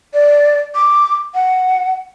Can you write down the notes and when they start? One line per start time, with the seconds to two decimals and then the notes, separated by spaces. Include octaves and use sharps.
0.14 D5
0.75 D6
1.34 F#5